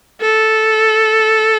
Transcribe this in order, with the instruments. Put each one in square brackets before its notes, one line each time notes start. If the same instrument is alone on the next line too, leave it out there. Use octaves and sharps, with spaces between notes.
[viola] A4